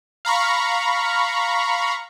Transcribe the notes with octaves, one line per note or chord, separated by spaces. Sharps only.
F5 A#5 B5 C#6